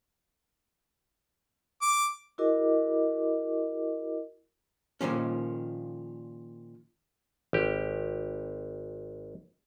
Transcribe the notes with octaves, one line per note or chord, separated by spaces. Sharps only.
D6
E4 F#4 G#4 A#4 D#5 D6
A#2 D#3 F3 C#4
G#1 G4